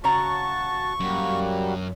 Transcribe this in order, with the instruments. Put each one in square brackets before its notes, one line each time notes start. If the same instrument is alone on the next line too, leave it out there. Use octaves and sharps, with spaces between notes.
[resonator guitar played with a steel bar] C#3 C#5 A#5 [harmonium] F#4 A5 [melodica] C#6
[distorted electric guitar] F#2 [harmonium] G3 A#3 F#4